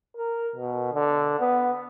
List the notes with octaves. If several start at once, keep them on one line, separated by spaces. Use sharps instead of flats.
A#4
B2
D3
B3